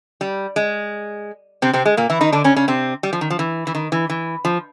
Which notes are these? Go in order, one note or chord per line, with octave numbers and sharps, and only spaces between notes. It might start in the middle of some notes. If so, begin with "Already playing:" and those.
G3
G#3
C3 C4
C3 C4
G#3
A#2 A#3
E3 E4
D#3 D#4
D3 D4
C#3 C#4
C#3 C#4
C3 C4
G3
F3
D#3
F3
E3
E3
D#3
E3
E3
F3